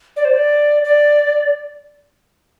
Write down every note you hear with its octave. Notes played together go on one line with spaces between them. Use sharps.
D5
C5
D5
D5